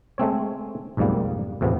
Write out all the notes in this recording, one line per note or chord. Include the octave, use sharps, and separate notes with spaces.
G#3 A3 C4 C#5
B1 F2 G#2 G3 A#3
E2 A2 C3 F3 B3